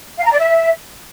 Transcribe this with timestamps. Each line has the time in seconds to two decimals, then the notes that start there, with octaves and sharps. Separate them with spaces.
0.17 F5
0.24 A#5
0.31 D5
0.38 E5